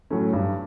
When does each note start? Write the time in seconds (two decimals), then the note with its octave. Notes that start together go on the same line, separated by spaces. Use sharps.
0.10 A2 F#3 A3 C#4
0.33 G2